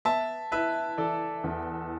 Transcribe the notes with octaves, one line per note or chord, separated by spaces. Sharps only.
B3 E5 A5
E4 B4 E5
E3 A4 D5
E2